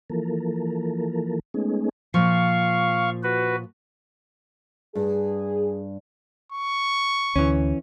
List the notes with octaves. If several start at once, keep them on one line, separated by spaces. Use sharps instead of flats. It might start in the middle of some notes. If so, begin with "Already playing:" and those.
E3 F3 A#3 A4 A#4
G#3 A3 B3 C#4 D#4 G#4
A#2 F3 F5 C#6
F#4 B4
G2 G#4
C#6
D2 E3 C#4